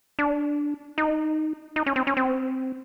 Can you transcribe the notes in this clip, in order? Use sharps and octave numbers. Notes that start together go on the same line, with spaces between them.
D4
D#4
D#4
C#4
C4
C#4
C4